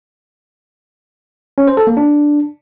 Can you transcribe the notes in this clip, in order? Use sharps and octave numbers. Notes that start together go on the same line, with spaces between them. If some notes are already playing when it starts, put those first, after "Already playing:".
C#4
C5
A4
A#3
D4